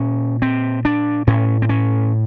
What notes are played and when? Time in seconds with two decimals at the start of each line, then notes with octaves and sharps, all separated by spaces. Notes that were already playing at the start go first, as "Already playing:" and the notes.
Already playing: A#2 C#4
0.42 C4
0.85 D4
1.27 A2 C#4
1.62 C4
1.69 C#4